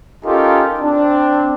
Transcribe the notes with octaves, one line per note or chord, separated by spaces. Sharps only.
C#4 D#4 F4 G4 A4 A#4
C4 D4